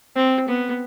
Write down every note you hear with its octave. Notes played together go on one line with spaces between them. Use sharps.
C4
B3